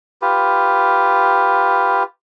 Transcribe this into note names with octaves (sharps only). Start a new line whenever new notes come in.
F4 G4 B4